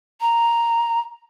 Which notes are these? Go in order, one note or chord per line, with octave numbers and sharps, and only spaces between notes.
A#5